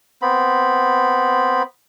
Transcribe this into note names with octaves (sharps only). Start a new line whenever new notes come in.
B3 C4 B5